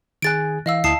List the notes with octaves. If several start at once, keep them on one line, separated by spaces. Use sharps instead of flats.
D#3 G#4 G#5 F#6 A6 D7
E3 D#5 F5 E6
D2 E4 A5 D#6 C7